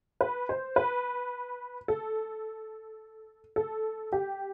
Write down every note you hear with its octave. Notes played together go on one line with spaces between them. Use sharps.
B4
C5
B4
A4
A4
G4